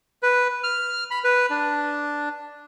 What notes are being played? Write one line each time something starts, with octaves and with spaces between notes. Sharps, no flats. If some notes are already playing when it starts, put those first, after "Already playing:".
B4
F6
B5
B4
D4